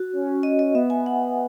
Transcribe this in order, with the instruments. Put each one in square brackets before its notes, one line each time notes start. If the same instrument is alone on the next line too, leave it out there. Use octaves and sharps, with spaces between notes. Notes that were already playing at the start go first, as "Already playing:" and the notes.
Already playing: [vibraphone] F#4
[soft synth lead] C#4
[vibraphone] D#5
D#5
[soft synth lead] B3 [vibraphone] E5
[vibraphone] G#5
F#5